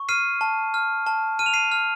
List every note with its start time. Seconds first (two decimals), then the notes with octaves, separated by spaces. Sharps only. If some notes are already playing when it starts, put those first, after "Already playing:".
Already playing: C#6
0.09 F6 C7 D#7
0.41 A5
0.74 F6
1.06 A5
1.39 F6 D#7
1.46 F7
1.54 C7 D#7
1.72 F6